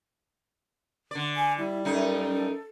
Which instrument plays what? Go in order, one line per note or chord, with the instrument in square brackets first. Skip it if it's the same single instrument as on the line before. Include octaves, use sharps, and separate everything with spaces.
[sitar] D3 D5
[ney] G#5
[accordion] G3 [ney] E4
[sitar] F#2 D#4 [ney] A4